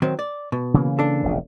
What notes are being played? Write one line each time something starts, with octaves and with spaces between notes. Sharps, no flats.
D#3 F#3 C4
D5
B2
C#3 E3 A#3
D4 A4
E1 A#1 C#3